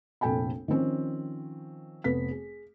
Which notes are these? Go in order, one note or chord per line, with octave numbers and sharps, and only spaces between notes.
F1 A#1 A4 G5 G#5 B5
D#3 F3 C4 C#4
F1 B3 B6
G#4